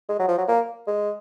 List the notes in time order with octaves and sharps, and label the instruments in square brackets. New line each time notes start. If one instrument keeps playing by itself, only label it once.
[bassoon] G#3
F#3
F3
F#3
A#3
G#3